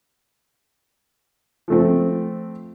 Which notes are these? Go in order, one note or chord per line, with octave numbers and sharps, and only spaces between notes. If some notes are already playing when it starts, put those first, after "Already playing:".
F3 A3 C4